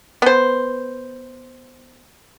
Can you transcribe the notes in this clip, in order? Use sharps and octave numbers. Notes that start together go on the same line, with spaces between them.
B3 C5